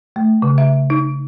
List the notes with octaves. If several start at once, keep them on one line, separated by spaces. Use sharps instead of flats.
A3
C#3
E5
D#4